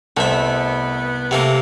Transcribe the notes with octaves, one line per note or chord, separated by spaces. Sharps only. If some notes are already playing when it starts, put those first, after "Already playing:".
C2 A3 B3 C5 D#5 E5 A5
C3 A3 A#3 G5 A5